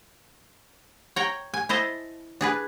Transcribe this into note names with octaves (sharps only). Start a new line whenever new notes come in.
C#5 G5 A#5
G#5
E4 C5 D#5 A5
D4 G#4 B4